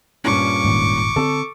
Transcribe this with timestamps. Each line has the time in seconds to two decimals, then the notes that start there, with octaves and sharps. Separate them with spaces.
0.24 G2 A#2 C#4 C#6 D6
0.65 D#1 D#2 G#2
1.16 D3 C4 A4